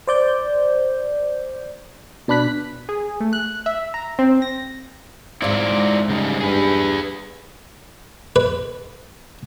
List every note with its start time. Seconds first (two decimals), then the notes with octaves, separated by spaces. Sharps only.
0.07 C5 D5 G6
2.28 B2 D4 B5 F#6 B6
2.89 G#4
3.20 A3
3.33 F#6
3.66 E5
3.94 A#5
4.19 C4
4.42 A#6
5.42 G#2 C4 E4 F4 D5
6.09 C#3 G3 D#4
6.40 G2 G#4 B4
8.36 B4